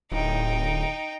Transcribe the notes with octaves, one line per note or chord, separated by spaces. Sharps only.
D1 D#4 G5